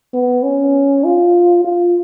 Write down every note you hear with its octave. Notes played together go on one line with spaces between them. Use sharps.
B3
C#4
F4
F4